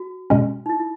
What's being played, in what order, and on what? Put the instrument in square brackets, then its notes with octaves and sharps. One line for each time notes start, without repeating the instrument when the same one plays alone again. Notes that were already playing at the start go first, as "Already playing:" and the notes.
Already playing: [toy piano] F#4
[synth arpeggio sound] B2 G#3 C#4
[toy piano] D#4
E4
E4